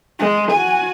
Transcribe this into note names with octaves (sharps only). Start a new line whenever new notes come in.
G#3
F#4 G#5